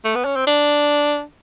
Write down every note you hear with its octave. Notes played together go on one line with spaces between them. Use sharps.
A3
B3
C#4
C4
D4